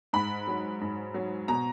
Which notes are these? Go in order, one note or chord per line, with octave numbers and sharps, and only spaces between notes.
G#2 B5
F#3
G#2
F#3
B2 A#5